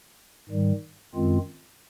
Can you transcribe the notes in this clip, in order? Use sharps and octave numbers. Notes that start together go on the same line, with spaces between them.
G#2 D#3 G3
F#2 D#3 G#3 C4 F4